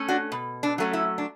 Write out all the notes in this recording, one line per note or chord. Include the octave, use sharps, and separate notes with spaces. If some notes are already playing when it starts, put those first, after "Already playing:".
Already playing: A3 C#4
D4 F#4
B2
D4
F#3 A3 C#4
E4
D4